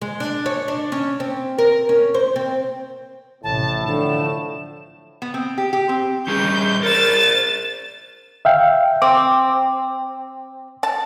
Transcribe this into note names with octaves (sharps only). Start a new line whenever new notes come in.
G#3
D4
C#5
D4
C#4
C4
A#4
C#4
C5
C4
A1 A2 C3 A5
D3 F3 E7
B3
C4
G4
G4
C4
G3 C#4 G#4 G6
A#4 C5 A6 E7
E5 F5 G5
C4 D6
A5